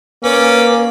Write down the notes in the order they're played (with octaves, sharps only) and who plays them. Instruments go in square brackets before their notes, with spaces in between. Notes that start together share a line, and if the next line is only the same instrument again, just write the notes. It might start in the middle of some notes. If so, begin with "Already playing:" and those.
[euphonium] A#3 [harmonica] C#4 D5 [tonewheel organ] B4